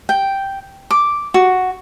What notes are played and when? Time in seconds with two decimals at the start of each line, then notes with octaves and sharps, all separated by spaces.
0.09 G5
0.91 D6
1.34 F#4